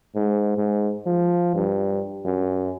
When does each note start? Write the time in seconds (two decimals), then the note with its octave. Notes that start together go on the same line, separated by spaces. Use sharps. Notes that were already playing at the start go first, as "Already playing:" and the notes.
0.15 G#2
0.57 G#2
1.06 F3
1.55 G2
2.25 F#2